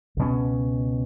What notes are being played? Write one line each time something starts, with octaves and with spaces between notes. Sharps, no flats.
C#2 B2 F#3 C#4